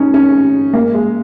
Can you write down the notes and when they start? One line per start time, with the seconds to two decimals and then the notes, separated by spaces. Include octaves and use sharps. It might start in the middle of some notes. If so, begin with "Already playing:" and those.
Already playing: C#4 D#4
0.14 C#4
0.73 A#3
0.94 G#3